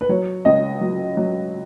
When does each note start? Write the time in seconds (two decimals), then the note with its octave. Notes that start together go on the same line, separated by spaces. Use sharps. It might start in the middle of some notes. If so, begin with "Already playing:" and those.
0.01 B4
0.09 F#3 C#5
0.45 C#2 D#5
0.81 F#3
1.17 F#3